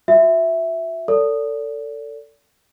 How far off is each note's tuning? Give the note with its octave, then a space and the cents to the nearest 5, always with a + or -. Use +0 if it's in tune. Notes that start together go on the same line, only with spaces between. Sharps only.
F#4 -30 E5 +0
A4 +25 D5 -35